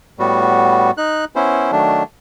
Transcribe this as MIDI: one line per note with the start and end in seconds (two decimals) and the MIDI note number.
0.19 0.91 45
0.19 0.91 55
0.19 0.91 59
0.19 0.91 66
0.98 1.25 63
0.98 1.25 90
1.36 1.71 59
1.36 1.71 61
1.36 1.71 64
1.36 1.71 72
1.72 2.03 51
1.72 2.03 54
1.72 2.03 57
1.72 2.03 62